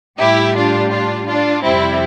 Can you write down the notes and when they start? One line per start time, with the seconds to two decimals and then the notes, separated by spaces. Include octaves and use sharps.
0.19 A2 G3 E4 G4
0.55 D4 F4
0.91 D4 F4
1.27 D4 F4
1.63 F2 C3 G3 C4 E4